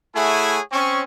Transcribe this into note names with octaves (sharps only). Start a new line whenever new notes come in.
A3 E4 G#4 C#5 F#5 G#5
C4 C#4 C#6